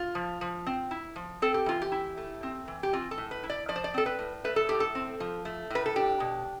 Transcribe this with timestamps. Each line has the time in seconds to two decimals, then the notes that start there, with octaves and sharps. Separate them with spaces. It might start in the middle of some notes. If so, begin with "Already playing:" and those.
Already playing: F4
0.15 F3
0.41 F3
0.67 C4
0.91 E4
1.16 F3
1.42 C4 A4
1.54 G4
1.66 E3 F4
1.82 G4
1.92 E4
2.17 A3
2.43 C4
2.68 E3
2.83 G4
2.93 C4 F4
3.11 A4
3.18 A2
3.31 B4
3.43 E4
3.50 D5
3.69 F3 D5
3.76 C5
3.84 D5
3.94 C4 A4
4.06 B4
4.19 A2
4.44 A3 B4
4.56 A4
4.69 A2 G4
4.80 A4
4.95 C4
5.20 F3
5.45 A3
5.70 A2 B4
5.86 A4
5.96 D4 G4
6.20 B2